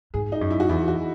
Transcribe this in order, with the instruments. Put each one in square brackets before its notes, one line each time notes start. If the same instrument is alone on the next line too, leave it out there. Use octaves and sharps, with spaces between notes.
[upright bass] G#2 [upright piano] G#4
[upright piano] D#4
[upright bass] F#2
[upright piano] E4
F#4
[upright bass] E2 [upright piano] E4
[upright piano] F#4